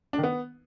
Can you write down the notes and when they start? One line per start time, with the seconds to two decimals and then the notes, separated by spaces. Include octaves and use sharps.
0.13 D4
0.18 D#3
0.23 B3